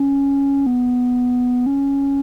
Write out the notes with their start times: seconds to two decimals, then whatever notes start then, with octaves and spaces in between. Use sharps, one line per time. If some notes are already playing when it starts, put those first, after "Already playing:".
Already playing: C#4
0.66 B3
1.66 C#4